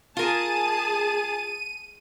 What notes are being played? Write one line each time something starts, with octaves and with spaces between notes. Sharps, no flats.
F4 G#4 A#4 A5 D#7